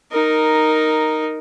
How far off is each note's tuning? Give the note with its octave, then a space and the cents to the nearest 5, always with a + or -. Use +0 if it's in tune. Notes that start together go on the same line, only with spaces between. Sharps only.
D#4 +0 A#4 +0